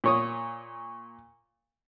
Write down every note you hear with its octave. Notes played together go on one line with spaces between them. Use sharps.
A#2 C#5 D#6